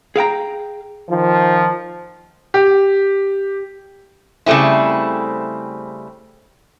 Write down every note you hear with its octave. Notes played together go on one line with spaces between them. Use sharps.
G#4 F5 G5 A#5
D#3 F3
G4
C#3 G3 A3 C4 E4